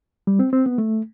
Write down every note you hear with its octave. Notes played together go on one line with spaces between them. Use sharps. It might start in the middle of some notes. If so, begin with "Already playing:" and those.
G3
C4
C4
B3
A3